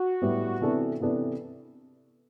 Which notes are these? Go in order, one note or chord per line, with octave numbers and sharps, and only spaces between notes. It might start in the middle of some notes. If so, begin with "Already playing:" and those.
Already playing: F#4
A2 G3 B3
C3 E3 B3 D4 A4
C3 E3 B3 D4 A4